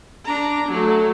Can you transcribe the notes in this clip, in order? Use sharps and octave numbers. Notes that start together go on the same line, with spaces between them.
D4 A#5
F#3 A3